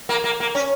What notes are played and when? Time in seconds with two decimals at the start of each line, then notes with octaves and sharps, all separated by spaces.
0.09 A#3
0.24 A#3
0.40 A#3
0.55 C#4